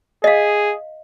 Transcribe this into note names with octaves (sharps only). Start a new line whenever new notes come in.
G#4 D#5 F5